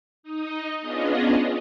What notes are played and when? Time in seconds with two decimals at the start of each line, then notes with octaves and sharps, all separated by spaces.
0.23 D#4 D#5
0.82 B3 C#4 D4 F4 G#4 D#5